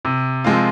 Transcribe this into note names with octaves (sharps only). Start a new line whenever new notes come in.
C3
F3 G#3 C4 F4